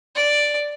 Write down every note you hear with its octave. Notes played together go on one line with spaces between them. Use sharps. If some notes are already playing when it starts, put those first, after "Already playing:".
D5